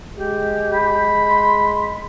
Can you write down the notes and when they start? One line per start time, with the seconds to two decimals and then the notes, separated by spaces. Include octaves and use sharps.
0.16 G#3 G4
0.74 B5
1.28 C6